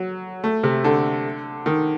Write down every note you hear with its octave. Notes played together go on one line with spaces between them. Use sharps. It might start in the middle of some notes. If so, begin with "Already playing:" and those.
Already playing: F#3
A3
C3
D3
D#3